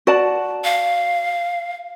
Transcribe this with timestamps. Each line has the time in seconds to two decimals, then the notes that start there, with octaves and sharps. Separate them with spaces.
0.07 F#4 D5 A5
0.64 F5